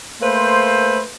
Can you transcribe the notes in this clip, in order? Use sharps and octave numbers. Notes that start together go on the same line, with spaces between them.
A3 A#3 B4 C5